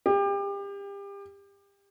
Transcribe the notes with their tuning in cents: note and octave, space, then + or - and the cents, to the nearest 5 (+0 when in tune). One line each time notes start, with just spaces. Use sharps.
G4 +30